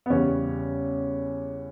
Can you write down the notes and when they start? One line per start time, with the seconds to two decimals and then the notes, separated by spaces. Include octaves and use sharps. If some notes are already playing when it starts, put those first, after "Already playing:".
0.06 B3
0.10 E2 C#3 G3 C#4